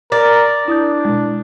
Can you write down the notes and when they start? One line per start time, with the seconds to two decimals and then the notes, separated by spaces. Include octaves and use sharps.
0.12 A#4 D5
0.68 D4 E4 D#6 G6
1.05 B2 G#3